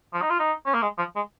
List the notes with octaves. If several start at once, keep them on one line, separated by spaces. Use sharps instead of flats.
F3
D#4
F4
D#4
C#4
A#3
G#3
F3
G#3